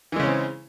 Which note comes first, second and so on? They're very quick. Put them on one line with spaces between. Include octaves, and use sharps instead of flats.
E3 G#3 C#3 C#4 C4